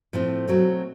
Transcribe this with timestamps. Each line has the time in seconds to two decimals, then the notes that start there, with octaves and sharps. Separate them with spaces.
0.13 A2 F3 A3 C4
0.48 B2 F#3 A3 C4